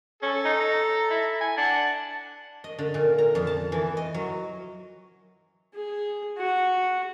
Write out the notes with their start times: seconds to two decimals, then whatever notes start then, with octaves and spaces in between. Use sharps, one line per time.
0.23 C#4 A4
0.45 D#4
0.60 A#5
1.11 E4
1.41 G#5
1.58 D4 F#5
2.64 D#5
2.79 D3
2.94 A#2
3.18 A#5
3.35 F2
3.47 A5
3.72 E3
3.97 D#5
4.14 F#3
5.74 G#4
6.38 F#4